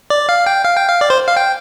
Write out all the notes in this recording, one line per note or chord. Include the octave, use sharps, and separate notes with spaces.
D5
F5
G5
F5
G5
F5
D5
C5
F5
G5